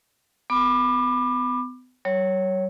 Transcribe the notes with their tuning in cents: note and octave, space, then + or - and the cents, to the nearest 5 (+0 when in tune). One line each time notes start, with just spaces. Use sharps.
B3 +35 B5 +0 D6 +25
G3 -45 C#5 +0